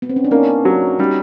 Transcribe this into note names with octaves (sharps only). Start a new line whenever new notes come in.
B3
C4
C#4
D4
A#3 C#4 D#4
F#3
G3 C#4 D#4